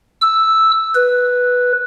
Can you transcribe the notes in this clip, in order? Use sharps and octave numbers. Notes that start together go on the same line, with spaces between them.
E6
B4